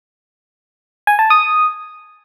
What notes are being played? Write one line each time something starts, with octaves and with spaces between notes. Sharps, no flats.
G#5
A5
D#6